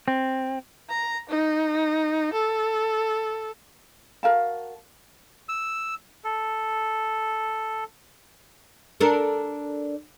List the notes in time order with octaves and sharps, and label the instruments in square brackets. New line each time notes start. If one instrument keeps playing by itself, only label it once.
[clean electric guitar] C4
[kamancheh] A#5
D#4
A4
[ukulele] F#4 A#4 F5 A5
[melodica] E6
A4
[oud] D4 A4 A#4